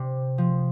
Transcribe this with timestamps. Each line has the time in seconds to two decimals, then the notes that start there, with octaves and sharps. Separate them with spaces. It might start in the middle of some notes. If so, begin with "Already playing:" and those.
Already playing: C3
0.38 F3